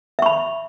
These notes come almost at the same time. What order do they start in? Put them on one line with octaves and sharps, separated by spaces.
E5 C#6 B5